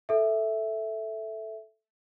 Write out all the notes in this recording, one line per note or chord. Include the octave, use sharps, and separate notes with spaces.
A4 E5